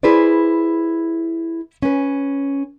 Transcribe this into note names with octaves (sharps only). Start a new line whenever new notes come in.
E4 G#4 B4 C5 D5
C#4 B4